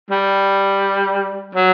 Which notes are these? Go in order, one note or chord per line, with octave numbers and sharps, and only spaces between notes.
G3
F#3